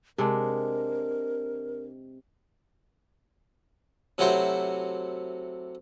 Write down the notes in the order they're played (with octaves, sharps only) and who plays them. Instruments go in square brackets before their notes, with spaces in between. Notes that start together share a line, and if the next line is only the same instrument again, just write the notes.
[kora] C3 G#3 D4 [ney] A#4
[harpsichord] C3 F#3 A3 E4 F#4 C5